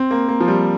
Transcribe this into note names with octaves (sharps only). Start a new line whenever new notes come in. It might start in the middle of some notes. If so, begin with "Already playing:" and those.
Already playing: C4
A#3
A#3
F3
G3